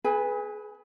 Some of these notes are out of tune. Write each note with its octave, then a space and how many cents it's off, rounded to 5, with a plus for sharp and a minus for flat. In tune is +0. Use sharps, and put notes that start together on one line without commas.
G#4 +30 B4 +0 G#5 -30